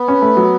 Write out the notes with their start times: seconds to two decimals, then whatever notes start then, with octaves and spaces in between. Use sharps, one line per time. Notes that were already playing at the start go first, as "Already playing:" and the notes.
Already playing: B3
0.08 C#4
0.22 A3
0.37 F#3